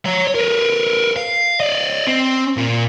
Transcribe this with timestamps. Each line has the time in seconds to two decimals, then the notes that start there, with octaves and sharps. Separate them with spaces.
0.06 C#5 A#5
0.35 A#4 B4
1.16 F5
1.60 D5 D#5
2.07 C4
2.57 A#2